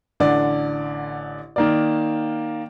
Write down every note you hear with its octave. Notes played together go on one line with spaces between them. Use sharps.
A1 D3 D5
D#3 A#3 D5